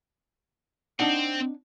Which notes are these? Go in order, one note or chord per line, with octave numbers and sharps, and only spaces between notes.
C4 D4 D#4 F#5